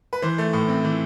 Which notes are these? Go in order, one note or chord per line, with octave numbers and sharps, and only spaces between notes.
B4
E3 C5
A3
A2
C4
E3